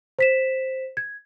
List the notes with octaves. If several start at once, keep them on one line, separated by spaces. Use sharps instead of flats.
C5 B6 E7
G#6